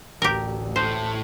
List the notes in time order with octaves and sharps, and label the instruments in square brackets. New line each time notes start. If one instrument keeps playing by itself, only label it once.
[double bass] A1 D2 [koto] G4 A#4
[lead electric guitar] A2 [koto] C5